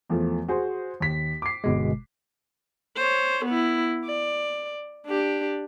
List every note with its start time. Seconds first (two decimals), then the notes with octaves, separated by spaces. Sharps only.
0.10 E2 F3 A3
0.48 F#4 G#4 C5
1.00 D#2 B6
1.42 D6 C7
1.64 G1 B2 G#3
2.97 C5 C#5
3.45 B3 E4
4.05 D5
5.07 D4 G4